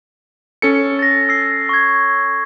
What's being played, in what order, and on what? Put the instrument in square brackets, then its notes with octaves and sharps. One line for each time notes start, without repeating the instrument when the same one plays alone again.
[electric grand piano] C#4 A4 C#7
[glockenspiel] A6 A#6
E6 C7
C#6 G#6